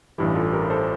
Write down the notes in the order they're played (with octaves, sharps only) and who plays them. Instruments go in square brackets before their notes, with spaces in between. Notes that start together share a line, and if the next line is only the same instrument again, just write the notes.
[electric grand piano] A1 G2 E3 E4 G4
F4 A4
G4 A#4
A4 C5